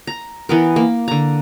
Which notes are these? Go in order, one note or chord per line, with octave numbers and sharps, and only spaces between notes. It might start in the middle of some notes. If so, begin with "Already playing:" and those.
A#5
E3 B3 A#4
A#3
D3 A#5